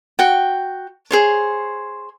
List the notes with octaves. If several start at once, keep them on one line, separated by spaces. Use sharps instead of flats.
F#4 G5
G#4 C5 C#5